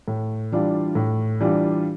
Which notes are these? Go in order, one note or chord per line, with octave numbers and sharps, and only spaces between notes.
A2
E3 G3 D4 F4
A2
E3 G3 D4 F4